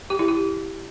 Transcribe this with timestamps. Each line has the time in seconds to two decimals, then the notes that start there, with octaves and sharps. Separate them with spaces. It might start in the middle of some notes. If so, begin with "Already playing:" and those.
0.10 G4
0.19 E4
0.28 G4